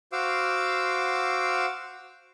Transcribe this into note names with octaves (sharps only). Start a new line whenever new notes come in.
F#4 C5 F5 D6 E6